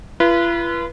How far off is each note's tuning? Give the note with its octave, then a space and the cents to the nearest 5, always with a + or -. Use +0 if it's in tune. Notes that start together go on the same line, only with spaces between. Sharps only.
F4 -45 B4 -20